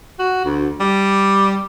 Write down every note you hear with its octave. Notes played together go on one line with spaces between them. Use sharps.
F#4
D2
G3